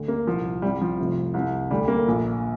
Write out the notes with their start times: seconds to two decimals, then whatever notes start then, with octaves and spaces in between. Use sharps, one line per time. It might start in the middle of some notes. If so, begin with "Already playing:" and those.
Already playing: D2 D3
0.08 A#3
0.27 C2 A#2 F3
0.62 C2 C3 G3
0.81 F3
0.99 F1 F2 C3
1.34 C2 C3
1.70 D2 D3 G3
1.88 A#3
2.07 A#1 A#2